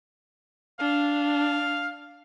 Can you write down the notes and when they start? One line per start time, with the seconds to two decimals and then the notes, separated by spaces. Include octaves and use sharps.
0.80 D4 F5